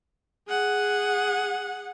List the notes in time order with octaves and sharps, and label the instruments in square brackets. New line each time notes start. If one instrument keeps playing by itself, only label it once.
[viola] G#4 F#5